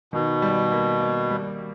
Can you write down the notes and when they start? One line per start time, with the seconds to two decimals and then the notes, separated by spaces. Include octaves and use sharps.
0.13 B2 D#3
0.42 G3
0.72 A#3
1.01 A#3
1.30 G3